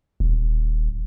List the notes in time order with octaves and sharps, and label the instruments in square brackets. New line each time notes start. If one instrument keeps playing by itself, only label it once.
[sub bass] D#1